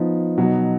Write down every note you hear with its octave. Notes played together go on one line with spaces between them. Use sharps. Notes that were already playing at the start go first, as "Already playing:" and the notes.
Already playing: F3 B3 D#4
B2 F#3 B3 D#4